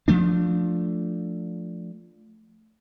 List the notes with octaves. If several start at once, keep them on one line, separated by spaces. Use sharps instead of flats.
F3 A3 D4